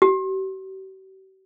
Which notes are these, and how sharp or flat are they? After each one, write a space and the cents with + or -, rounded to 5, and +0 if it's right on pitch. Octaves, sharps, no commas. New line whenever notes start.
G4 -45